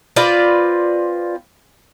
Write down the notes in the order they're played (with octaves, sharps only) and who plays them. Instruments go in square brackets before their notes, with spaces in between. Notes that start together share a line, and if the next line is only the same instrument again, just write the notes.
[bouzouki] C4 F4 B4 D5